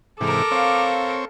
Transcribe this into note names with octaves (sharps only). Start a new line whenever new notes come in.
G#2 C3 E3 A4 A#4 D6
C4 C#5 F5